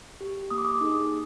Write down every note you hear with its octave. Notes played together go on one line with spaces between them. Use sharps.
G4
A#3 D#6
D6
D#6
D#4 G#4